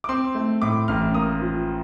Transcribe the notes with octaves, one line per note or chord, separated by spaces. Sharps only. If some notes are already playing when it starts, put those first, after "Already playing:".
D6
C4 C6
A3
A2 D6
A1 F6
A#3 D#6
F3